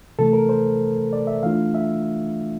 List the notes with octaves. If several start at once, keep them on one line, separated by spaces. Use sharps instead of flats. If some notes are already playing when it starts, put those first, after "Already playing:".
C3 E3 A3 A4
A#4
C5
D5
E5
E3 A3 D4 F4 F5
E5